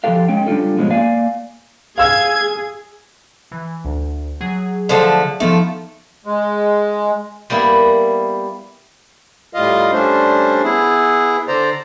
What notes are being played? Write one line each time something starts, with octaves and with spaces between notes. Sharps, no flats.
F3 F#4 G4 A4 F5
G#3 C#4 C#5 G5
G3 D4 F4 A4
G#2 B2 F3 G#3 C#4
A#3 D5 F5 G#5
G#4 F5 E6 G#6
E3
D2
F#3 G#4
D3 F3 A3
F3 A3 B3 D#4
G#3
G3 A#3 B3 E4
A2 G3 F4 D#5 F5
G3 A3 C#4 D4 C5
B3 E4 G#4
D3 C5 D5 A#5